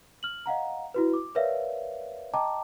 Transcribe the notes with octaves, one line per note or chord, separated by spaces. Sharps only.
F6 F#7
D#5 F5 F#5 A#5
E4 F#4 B4
D6
A#4 B4 C#5 D5 E5 F5
D#5 G5 A5 A#5 D6